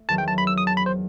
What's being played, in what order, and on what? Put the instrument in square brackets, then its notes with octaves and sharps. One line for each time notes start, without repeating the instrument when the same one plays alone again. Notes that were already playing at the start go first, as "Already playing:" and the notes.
Already playing: [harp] A3
[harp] E2 D#3 F#3 [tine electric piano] A5
[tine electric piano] G5
A5
B5
E6
D#6
A5
B5
C5